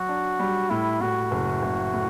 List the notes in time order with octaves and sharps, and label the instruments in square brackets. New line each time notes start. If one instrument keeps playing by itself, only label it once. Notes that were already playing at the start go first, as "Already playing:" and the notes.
Already playing: [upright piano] F#3 [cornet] F#4
[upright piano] D4
G3
[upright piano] A2 [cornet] E4
[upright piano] A2 [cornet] F#4
[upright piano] F#1
F#1
A2